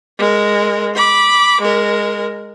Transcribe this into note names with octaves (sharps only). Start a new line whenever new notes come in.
G#3 A#4
B5 D6
G#3 A#4